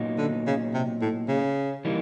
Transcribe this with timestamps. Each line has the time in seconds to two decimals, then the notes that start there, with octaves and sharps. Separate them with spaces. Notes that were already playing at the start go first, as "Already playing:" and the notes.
Already playing: A#2 F#3 B3 D#4
0.18 D3
0.46 C#3
0.74 C3
1.01 A2
1.28 C#3
1.85 E3 G3 A#3 D#4